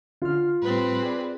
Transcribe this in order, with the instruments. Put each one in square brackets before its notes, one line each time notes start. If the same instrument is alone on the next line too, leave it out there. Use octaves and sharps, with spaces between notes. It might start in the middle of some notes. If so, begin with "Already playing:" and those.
[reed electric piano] D3 F6 [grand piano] F4
[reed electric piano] A2 G3 [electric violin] C4 B4
[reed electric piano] G#4 D5